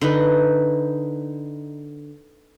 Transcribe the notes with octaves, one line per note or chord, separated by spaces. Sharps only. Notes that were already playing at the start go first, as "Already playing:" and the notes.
D3 D#4 B4